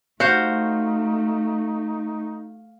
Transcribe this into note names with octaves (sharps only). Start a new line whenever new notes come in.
A3 D#4 F#4 C5 F5